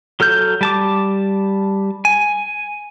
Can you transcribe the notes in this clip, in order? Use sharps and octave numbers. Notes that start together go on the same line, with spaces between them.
F#3 A4 F6 G6
G3 A5 D6
G#5